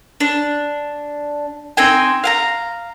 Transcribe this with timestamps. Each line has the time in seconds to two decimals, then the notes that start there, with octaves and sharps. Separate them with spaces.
0.20 D4
1.77 C4 D#4 G5 G#5
2.24 F5 F#5 A#5